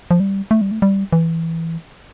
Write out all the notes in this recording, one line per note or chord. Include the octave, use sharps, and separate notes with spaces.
F3
G3
A3
G3
A3
G3
E3